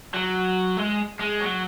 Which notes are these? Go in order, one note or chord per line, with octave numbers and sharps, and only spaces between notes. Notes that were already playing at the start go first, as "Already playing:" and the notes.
F#3
G#3
G#3
F#3